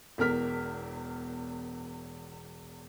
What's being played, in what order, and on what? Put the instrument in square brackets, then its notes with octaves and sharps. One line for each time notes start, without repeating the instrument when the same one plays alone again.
[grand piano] E1 E2 A#4 F6 B6